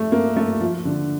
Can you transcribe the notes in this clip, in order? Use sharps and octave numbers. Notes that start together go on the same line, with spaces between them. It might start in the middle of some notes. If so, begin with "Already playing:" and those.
Already playing: A3
A#3
A3
F3
D3